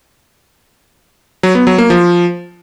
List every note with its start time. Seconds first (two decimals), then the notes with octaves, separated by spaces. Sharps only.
1.43 F#3
1.55 B3
1.67 F#3
1.78 A#3
1.90 F3